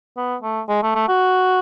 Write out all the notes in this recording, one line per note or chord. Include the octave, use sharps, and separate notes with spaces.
B3
A3
G#3
A3
A3
F#4